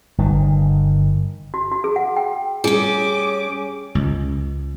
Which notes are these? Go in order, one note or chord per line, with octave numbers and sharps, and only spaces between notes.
G1 D#3
F#4
F#4
G#4
F#5
G5
G3 C#4 G#4 D6
C#2